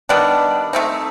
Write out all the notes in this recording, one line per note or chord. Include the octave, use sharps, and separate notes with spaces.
D#3 G3 B3 D4
A3 C4 D#4